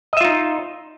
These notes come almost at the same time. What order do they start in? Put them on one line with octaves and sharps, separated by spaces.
D#5 E5 F4 D#4